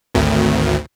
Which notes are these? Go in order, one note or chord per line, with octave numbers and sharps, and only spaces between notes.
G#1 D2